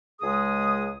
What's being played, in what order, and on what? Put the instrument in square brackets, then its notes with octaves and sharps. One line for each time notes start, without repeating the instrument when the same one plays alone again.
[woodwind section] C#2 G#3 G#4 D#6